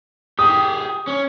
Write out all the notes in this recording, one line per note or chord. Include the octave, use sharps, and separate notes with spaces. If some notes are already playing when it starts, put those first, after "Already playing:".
G4 G#4 D#6
C#4